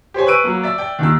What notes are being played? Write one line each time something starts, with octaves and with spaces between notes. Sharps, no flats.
G4 C5 C#5 G#5
B4 C#6 E6 D7 D#7
F#3 A#3
D5 E5 E6
D5 G5
D#2 D#3 E6